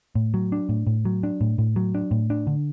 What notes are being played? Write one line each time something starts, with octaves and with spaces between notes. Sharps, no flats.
A2
F#3
D4
A2
A2
F#3
D4
A2
A2
F#3
D4
A2
D4
D3